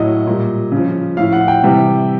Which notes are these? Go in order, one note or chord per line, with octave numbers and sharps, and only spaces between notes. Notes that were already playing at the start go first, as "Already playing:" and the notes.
Already playing: A2 F#3 D#5
A#2 G3
C#3 F3
A2 F3 F5
F#5
G5
C3 E3 G3